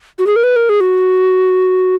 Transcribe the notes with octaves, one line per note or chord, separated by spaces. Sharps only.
F#4
G#4
A#4
B4
A#4
G#4
F#4